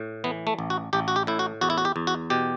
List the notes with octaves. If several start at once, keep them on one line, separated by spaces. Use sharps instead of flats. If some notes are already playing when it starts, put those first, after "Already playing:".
Already playing: A2
E3 B3
A3
A1
F#4
A1 G4
F#4
G4
A2 E4
F#4
E2 F#4
E4
F#4
G4
E2
F#4
B2 G4